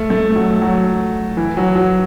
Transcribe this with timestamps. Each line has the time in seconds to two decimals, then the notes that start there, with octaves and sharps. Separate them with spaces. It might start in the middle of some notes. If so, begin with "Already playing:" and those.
Already playing: A3
0.10 A3
0.36 F#3
0.62 F#3
1.37 E3
1.57 F#3
1.76 F#3